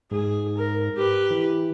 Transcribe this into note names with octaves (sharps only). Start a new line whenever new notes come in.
G#2 G#4
A#4
G4 B4
E3